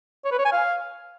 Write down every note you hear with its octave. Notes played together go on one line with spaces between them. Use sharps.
C#5
B4
C#5
G#5
F5